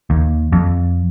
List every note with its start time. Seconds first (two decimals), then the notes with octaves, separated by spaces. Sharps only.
0.10 D#2
0.52 F2